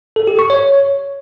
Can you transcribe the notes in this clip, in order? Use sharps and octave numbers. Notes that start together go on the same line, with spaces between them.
A4
G4
C#6
C#5